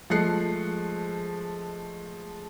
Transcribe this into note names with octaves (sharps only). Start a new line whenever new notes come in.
F3 G#3 A3 F#6 C7 C#7